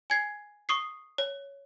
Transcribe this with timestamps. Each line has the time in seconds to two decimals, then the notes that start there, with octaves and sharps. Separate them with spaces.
0.10 G#5 G#6 C7
0.69 C#6 D#6 C7
1.18 C#5